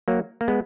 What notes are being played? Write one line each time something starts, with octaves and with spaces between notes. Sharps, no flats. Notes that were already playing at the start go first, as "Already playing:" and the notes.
F#3 A#3
A#3
G#3 B3